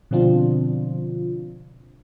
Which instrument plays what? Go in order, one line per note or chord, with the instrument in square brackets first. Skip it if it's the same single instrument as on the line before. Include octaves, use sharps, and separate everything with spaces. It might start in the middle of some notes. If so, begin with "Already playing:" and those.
[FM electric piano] B2 D3 F3 C4 D4 F4